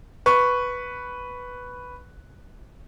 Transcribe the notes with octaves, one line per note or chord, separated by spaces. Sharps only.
B4 C#6